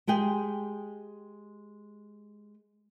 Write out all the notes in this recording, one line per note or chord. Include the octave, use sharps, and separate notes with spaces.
G#3 G4 G#4 G5